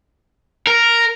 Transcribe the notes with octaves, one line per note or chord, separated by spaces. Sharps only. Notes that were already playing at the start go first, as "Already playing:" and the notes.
A#4